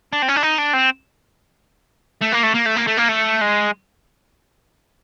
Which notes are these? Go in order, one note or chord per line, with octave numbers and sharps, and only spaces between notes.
D4
C4
C#4
D4
D#4
D4
C4
A3
A#3
A3
A#3
A3
A#3
A3
A#3
A3
G#3